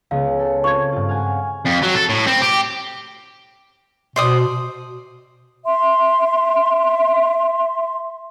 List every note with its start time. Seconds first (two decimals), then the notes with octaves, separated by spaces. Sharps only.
0.11 C#2 G#3 B3 F5
0.39 A4
0.64 C4 F4 C#6 G#6
0.92 G2 F4
1.09 F5 F#5 G#5
1.65 F2
1.82 F#3
1.95 A4
2.09 A2
2.27 C4
2.42 G4
4.16 B2 C5 D5 D#6
5.66 E5 C6